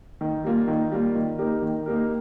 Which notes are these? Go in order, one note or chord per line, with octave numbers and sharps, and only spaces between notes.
D#3
G3 A#3 F4
D#3
G3 A#3 F4
D#3
A#3 D#4 G4 A#4
D#3
A#3 D#4 G4 A#4